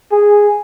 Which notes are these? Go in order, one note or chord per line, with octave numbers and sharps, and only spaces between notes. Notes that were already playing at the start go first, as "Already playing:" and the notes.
G#4